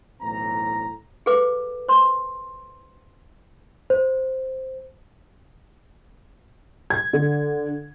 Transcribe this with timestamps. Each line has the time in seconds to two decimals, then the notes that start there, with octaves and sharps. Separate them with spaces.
0.21 B1 A2 E3 C4 A#5
1.26 G#4 A4 B4 F5 D6
1.88 C5 C6
3.90 C5
6.90 G#6
7.13 D3